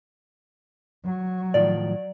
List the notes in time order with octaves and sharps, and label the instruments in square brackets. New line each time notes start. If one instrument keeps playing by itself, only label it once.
[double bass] F#3
[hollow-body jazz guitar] A2 D#3 F3 [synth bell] D5